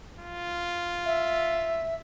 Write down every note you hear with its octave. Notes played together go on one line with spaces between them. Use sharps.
F4
E5